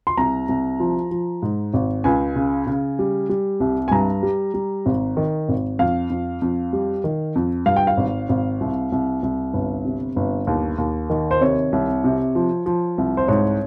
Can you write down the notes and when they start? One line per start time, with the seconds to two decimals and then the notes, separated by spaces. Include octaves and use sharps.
0.07 C6
0.17 C2 A#5
0.49 C2
0.80 F3
1.11 F3
1.42 G#2
1.73 G#1
2.04 C#2 G#5
2.36 C#3
2.67 C#3
2.99 G3
3.29 G3
3.60 C2
3.88 G#5
3.91 G2 A#5
4.23 G3
4.54 G3
4.86 G#1
5.17 D#3
5.48 G#1
5.79 F2 F5
6.10 F2
6.42 F2
6.73 G3
7.04 D#3
7.36 F2
7.66 G2 F5
7.76 G5
7.87 F5
7.97 G#1
8.29 G#1
8.60 C2
8.92 C2
9.23 C2
9.53 G1
9.85 C3
10.16 G1
10.47 D#2
10.78 D#2
11.10 D#3
11.31 C5
11.41 C3 C#5
11.72 C2
12.04 C3
12.35 F3
12.66 F3
12.98 C2
13.17 C5
13.28 G#2 C#5